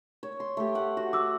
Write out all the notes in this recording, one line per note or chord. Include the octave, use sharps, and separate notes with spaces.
C#5
C6
A3 G4
F#5
F#4
F#4 D6 E6